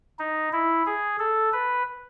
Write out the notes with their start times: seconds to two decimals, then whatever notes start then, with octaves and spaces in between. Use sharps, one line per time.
0.19 D#4
0.53 E4
0.86 G#4
1.19 A4
1.53 B4